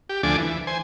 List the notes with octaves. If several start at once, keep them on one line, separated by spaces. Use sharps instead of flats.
G4
D2 F3 A3 D4 G#5 D6
E3
C5 G#5